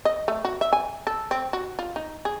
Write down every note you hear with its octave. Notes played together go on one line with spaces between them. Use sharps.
D#5
A3
F#4
E5
G#5
A4
C4
F#4
F4
D#4
G#4